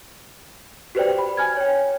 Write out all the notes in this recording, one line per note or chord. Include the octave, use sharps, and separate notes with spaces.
F#4 G4 B4 C5 D5 G5
B5
G#5 F6 G#6
C#5 G5